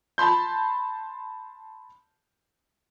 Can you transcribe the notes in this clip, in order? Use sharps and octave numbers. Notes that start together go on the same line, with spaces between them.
A5 B5 C6 G6